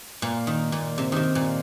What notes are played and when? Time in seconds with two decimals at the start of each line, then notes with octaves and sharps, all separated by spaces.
0.22 A#2
0.47 D#3
0.72 A#2
0.98 C3
1.12 C3 D#3
1.35 A#2